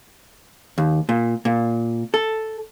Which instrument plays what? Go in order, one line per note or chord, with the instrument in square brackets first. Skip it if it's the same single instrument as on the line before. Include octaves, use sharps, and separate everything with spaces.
[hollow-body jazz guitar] D#2
A#2
A#2
A4